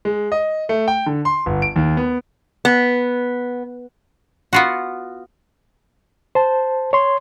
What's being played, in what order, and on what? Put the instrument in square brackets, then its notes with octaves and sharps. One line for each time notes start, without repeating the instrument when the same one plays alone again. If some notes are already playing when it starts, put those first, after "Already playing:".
[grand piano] G#3
D#5
A3
G5
D3
C6
G1
D7
D#2
B3
[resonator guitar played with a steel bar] B3
[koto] B3 F4 F#4
[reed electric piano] C5 A5
C#5 C6